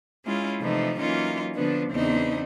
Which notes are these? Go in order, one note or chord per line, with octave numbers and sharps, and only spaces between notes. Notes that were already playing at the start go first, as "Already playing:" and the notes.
G#3 C#4 E4 F4
C3 E3 F3 A3 D#4
E3 F#3 A#3 C#4 D#4 F4
D3 F3 B3 D4
E2 C#3 C4 D4 D#4